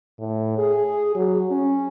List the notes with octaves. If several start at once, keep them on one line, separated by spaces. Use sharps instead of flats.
A2
G#4
F#3
C#4